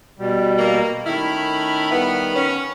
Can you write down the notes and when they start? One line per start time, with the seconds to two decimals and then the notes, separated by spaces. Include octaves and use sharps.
0.19 B2 G3
0.58 A#3
1.06 D#3 A3 C#4 E4 B5 F6
1.92 G3 B3
2.35 C#4